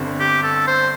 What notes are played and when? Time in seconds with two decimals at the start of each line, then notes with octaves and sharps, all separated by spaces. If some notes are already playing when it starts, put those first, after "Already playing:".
Already playing: G1 G2 D3 C4
0.20 G4
0.43 A4
0.67 C5